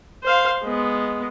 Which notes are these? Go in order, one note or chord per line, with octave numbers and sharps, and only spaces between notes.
C5 F5
G#3 B3